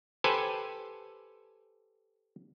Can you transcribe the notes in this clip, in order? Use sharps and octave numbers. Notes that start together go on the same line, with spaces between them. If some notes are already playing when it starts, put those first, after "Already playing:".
G4 A4 B4 C5 G#5